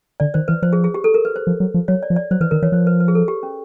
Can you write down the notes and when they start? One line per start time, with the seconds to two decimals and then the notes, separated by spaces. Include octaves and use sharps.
0.20 D3 D5
0.34 D#3 C5
0.48 E3 B4
0.62 F3 C5
0.73 G#4
0.84 G#4
0.94 G4
1.04 A4
1.14 A#4
1.25 B4
1.36 C5
1.47 F3
1.60 F#3
1.74 F3
1.88 F#3 C#5
2.03 D5
2.10 F3
2.16 D5
2.31 F#3 C5
2.40 E3 B4
2.51 D#3 A#4
2.62 E3 C#5
2.72 F3 C5
2.87 B4
3.00 B4
3.08 G#4
3.15 A4
3.28 G4
3.43 C#4